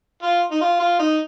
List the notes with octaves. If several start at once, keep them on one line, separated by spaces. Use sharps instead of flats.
F4
D#4
F4
F4
D#4